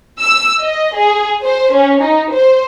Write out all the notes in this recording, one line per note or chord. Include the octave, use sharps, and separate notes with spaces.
E6
D#5
G#4
C5
C#4
D#4
C5